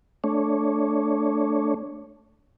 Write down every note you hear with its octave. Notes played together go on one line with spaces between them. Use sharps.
A3 D4 C#5